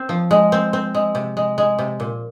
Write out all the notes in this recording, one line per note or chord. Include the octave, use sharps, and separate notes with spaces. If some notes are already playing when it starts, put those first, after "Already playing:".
Already playing: C4
F3
G#3
C4
C4
G#3
C3
G#3
G#3
C3
A#2